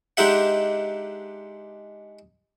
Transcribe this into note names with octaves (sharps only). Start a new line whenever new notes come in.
G#3 D4 D#4 G4 E5 F#5